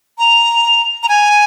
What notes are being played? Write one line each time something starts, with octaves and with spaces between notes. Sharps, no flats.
A#5
A#5
G#5